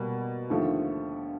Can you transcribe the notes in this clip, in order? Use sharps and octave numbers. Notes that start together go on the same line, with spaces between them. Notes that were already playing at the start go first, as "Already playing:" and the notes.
Already playing: B2 G3 A#3
D#2 D3 F3 A3